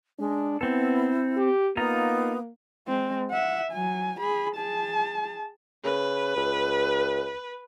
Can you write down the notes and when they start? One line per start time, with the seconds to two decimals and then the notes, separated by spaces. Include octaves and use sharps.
0.19 G#3 D4
0.61 B3 C4 E4 A4
1.37 G4
1.77 A#3 B3 D#4 F4 A#5
2.88 G#3 C4
3.31 E5 F#5
3.72 F#3 G#5
4.20 G#4 B5
4.56 G#4 A5
5.84 C#3 B4
6.36 C#2